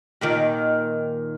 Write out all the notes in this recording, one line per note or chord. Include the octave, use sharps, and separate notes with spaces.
D#2 A#2 D#3